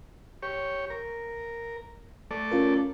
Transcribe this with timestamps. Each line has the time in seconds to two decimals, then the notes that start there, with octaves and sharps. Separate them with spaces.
0.43 G4 C#5
0.90 A#4
2.31 A3 A4 D5
2.51 C#4 F4 A#4